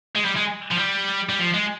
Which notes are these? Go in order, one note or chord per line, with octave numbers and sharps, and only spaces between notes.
G#3
G3
G#3
F3
G3
G3
F3
G#3